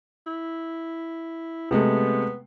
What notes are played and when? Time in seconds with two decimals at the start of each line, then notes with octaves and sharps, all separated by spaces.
0.26 E4
1.71 C3 G#3 A3 B3